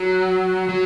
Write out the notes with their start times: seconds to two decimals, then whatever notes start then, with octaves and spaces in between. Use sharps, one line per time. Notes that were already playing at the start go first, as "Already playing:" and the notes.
Already playing: F#3
0.69 F#3